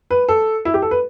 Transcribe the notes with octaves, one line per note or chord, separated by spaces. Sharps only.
B4
A4
E4
G4
A4
B4